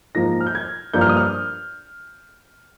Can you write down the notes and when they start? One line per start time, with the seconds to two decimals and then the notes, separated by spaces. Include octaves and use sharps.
0.15 G#2 F3 A#3 A#6
0.41 F6
0.47 G6
0.55 G#6
0.94 G2 F3 A#3 G6
1.01 F6
1.09 D#6
1.17 F6